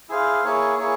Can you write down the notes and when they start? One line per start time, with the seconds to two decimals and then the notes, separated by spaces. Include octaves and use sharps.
0.09 E4 G#4 C5 F5
0.43 A#3 E4 G#4 C#5
0.78 A#3 E4 G#4 C#5